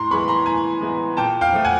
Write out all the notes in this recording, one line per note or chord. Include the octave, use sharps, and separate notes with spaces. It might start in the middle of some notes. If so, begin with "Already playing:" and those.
Already playing: A2 A#5 C6
E3 G#3 B3 B5 C#6
A#5 C6
A2 G#5 A#5
E3 G#3 B3
A#2 G5 A5
F5 G5
F3 A3
F#5 G#5